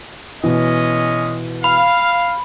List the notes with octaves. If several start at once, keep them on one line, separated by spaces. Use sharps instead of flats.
B2 E3 G#3 C#4 D#5
F5 B5